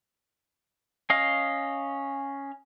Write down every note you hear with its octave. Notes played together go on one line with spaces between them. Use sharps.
C#4 D#5 F5